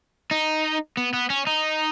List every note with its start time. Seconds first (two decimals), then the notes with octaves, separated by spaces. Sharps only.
0.31 D#4
0.97 B3
1.13 B3
1.30 C#4
1.47 D#4